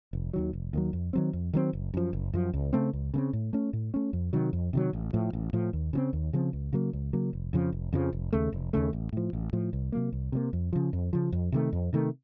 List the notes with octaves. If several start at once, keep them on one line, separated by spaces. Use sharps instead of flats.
F1
D#2 D#3 F#3
F1
D#2 D#3 F#3
F2
D#3 F#3 C4
F2
D#3 F#3 C4
F#1
F#2 F3
F#1
F#2 F3
C#2
C#3 A3 C4
C#2
C#3 A3 C4
A2
A3 C#4
A2
A3 C#4
F2
C3 D#3 F#3
F2
C3 D#3 F#3
A1
A2 F3
A1
A2 F3
D#2
C#3 F3 C4
D#2
C#3 F3 C4
C#2
C#3 F#3 A#3
C#2
C#3 F#3 A#3
F1
F2 C#3 F3
F1
F2 C#3 F3
F1
D#2 C#3 A3
F1
D#2 C#3 A3
A1
A2 F3
A1
A2 F3
C2
C3 F#3 A#3
C2
C3 F#3 A#3
F2
C#3 F3
F2
C#3 F3
F2
C3 D#3 A3
F2
C3 D#3 A3